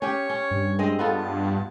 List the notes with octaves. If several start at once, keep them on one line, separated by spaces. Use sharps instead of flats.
C#4 G4 C#5
C#4
G2
G#3 C4 D#5
B3 F4 A4
A5